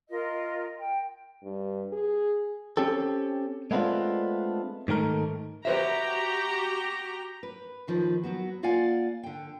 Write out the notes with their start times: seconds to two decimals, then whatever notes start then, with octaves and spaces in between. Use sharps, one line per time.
0.10 F4 A#4 D#5
0.78 G5
1.43 G2
1.93 G#4
2.77 C4 C#4 G4 A4
3.71 G#3 A3 B3 C4 D4 F4
4.88 G#2 D#3 A3 A#4
5.65 F#4 G4 B4 C5 E5 A#5
7.43 B4
7.87 D#2 D#3 F3 B4
8.23 F#3 B3 F#4
8.63 A#3 F4 D5 F5 F#5 G#5
9.23 D3 G5